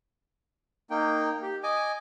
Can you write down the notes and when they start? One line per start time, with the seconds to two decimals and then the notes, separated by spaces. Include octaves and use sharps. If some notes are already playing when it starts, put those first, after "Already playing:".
0.90 A#3 D#4 G5
1.42 G4
1.63 D#5 G#5 D6